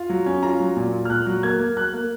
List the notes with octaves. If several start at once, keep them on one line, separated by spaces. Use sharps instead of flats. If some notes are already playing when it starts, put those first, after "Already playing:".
Already playing: F4
F#3
C#4
F4 A#5
F#3
A#2
F4
F6
A#2 F#6
F#3
A#3 G#6
A#3
F#3 F#6
A#3